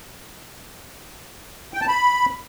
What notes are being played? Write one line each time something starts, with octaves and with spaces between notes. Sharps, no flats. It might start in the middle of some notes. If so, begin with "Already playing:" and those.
G5
A5
B5